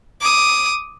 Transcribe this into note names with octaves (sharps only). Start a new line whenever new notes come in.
D6 D#6